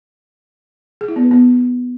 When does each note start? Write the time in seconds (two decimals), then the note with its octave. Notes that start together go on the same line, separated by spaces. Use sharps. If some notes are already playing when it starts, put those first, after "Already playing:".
1.01 G#4
1.08 E4
1.16 B3
1.24 B4
1.31 B3